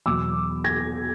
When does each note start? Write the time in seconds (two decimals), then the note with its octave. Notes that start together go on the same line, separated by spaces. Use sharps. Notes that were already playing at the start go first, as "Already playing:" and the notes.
0.06 E2 B2 F#3 D6 E6
0.64 G#6 A#6